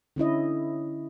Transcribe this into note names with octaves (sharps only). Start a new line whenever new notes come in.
D3 C#4 E4 D#5